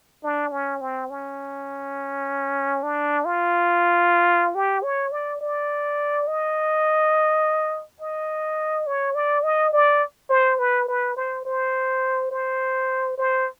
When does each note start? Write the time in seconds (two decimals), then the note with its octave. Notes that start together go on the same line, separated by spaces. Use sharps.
0.23 D4
0.52 C#4
0.81 C4
1.10 C#4
2.83 D4
3.25 F4
4.55 G4
4.83 C#5
5.12 D5
5.41 D5
6.27 D#5
8.00 D#5
8.87 C#5
9.15 D5
9.44 D#5
9.73 D5
10.30 C5
10.59 B4
10.88 B4
11.17 C5
11.45 C5
12.31 C5
13.18 C5